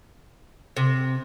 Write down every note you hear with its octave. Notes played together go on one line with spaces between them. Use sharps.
C3